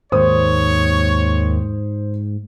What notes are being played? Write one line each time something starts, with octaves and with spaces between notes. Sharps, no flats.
D#2 G#2 C5 C#5 D#6